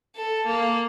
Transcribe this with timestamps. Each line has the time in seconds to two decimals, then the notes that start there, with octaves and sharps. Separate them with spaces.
0.16 A4
0.47 A#3